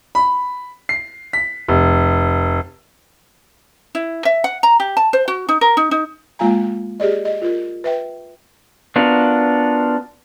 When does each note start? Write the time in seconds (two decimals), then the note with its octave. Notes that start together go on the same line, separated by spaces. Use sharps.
0.15 B5
0.89 C7
1.33 B6
1.68 F1
3.95 E4
4.25 E5
4.44 F#5
4.63 A#5
4.80 G4
4.97 A5
5.13 C5
5.28 F#4
5.49 D#4
5.61 A#4
5.77 D#4
5.91 D#4
6.39 G#3 A#3 F4 F5 G#5 A#5
7.00 G4 G#4 D5 D#5
7.25 D#5
7.42 F4 A#4
7.84 B4 E5 G5
8.96 B3 D4 F4 F#4 A#4